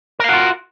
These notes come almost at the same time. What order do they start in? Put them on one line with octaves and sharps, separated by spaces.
A#4 F5 F#4 F4